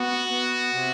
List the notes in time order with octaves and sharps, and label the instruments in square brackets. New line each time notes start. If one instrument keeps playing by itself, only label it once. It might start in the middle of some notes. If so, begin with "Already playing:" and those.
Already playing: [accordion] B3 [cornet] F#4
[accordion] B3
C3